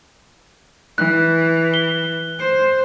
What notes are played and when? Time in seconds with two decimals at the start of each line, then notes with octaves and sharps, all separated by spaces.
0.98 E3 F#6
1.74 G7
2.40 C5